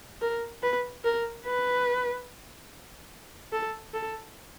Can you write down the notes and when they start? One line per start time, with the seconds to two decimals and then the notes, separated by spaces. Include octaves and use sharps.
0.21 A#4
0.63 B4
1.04 A#4
1.46 B4
3.52 A4
3.94 A4